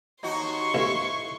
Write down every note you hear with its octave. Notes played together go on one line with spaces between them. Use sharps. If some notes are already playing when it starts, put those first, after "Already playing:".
D#2 D#4 F#4 C6 C#6
A1 E4